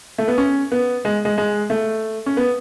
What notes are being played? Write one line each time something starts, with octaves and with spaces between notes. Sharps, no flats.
A3
B3
C#4
B3
G#3
G#3
G#3
A3
C#4
B3